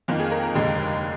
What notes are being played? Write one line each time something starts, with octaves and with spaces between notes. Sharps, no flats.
F2 D#3 A#3 F4
G#4
A#4
A#4
F1 D#2 D3 G#3